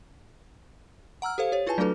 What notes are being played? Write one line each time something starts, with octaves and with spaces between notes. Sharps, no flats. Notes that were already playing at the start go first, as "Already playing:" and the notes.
F#5 A#5 E6 F6
G4 A4 C5 F5
G4 C#5
E4 F4 G#4 B4 G#5 A5
F#3 A3 D4 F#4 A4 B4